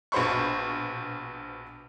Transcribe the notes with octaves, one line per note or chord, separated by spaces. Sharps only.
A#1 B2 C5 B5 C#6